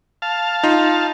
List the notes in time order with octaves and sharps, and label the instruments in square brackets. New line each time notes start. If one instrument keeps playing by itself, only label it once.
[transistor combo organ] F5 A5
[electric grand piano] D#4 F4